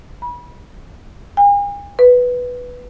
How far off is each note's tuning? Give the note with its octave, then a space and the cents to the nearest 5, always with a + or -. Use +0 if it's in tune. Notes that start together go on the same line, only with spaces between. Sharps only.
B5 -30
G#5 -45
B4 +0